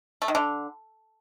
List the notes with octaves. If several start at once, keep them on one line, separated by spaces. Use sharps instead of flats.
A3
D#3
D3